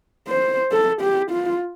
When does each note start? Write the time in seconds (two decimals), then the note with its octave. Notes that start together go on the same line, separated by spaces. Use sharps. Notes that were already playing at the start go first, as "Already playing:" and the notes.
0.28 C5
0.72 A4
1.01 G4
1.31 F4